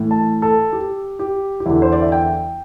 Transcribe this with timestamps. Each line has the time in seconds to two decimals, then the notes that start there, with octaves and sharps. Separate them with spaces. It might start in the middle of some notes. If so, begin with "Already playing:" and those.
Already playing: A2 E3
0.11 A5
0.42 A4
0.73 G4
1.19 G4
1.60 G4
1.66 E2 D3 E4
1.82 C5
1.92 D5
2.02 E5
2.12 G5